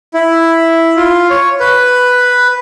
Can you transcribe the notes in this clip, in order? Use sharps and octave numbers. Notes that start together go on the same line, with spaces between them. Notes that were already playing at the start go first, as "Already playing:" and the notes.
E4
F4
C#5
B4